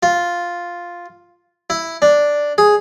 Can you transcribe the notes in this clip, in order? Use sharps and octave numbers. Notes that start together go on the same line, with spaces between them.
F4
E4
D4
G#4